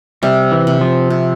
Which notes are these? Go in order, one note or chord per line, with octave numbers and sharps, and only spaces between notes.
C3 G3
E3
C3
F3
C3